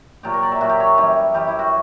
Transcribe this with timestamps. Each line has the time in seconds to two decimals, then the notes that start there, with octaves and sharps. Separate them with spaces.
0.23 A#2 F#3 G4
0.34 A#4
0.43 D5
0.52 E5
0.61 A#2 F#3 F#4
0.70 G4
0.80 C#5
0.97 F#2 E3 G3
1.34 F#2 E3 G3 G4
1.48 E4
1.59 F#4